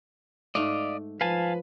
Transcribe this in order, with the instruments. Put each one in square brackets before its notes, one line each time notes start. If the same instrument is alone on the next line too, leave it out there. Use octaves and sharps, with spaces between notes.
[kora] G#2 A3 [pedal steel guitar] D5 [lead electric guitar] D#5 F5
[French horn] F3 [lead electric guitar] B4 [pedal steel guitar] F5 G#5 A5